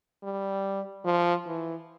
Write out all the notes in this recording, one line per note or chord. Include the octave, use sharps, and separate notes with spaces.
G3
F3
E3